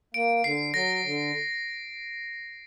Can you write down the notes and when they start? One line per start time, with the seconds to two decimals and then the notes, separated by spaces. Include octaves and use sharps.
0.14 A#3 D7
0.44 D3 C7
0.74 F#3 A#6
1.04 D3